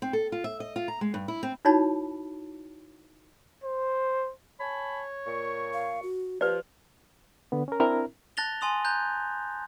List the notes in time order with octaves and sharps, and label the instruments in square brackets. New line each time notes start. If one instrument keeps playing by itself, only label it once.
[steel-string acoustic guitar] C4
A4
F4
E5
D#5
F4
A#5
G#3
G2
E4
C4
[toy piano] D#4 E4 F#4 C#5 A5 B5
[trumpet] C5
[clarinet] C#5 [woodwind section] G#5 A5 B5
[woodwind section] A#2 C#6
[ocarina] F5
F#4
[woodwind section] F3 [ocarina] G4 [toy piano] B4 D5
[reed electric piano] D3 B3
C#4 A#4
C4 D4 E4 A#4
[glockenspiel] A5 F#6 A6 A#6 F7 G7
G#5 C6 D#6 F7
A#5 F#6 G6